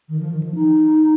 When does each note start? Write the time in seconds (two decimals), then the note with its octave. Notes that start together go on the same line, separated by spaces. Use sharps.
0.09 D#3
0.20 F3
0.32 D#3
0.43 F3
0.55 D#4